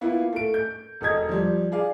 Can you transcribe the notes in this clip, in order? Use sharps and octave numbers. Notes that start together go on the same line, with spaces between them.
A#3 B3 E4 F4
A3 D7
G6
E1 A4 D#5 G#6
F3 G3
G#4 D5 F5